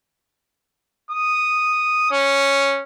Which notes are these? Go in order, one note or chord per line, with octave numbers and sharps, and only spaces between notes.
D#6
C#4